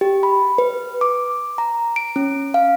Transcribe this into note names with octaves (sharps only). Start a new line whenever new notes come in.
G4
B5
B4
D6
A#5
D7
C#4
F5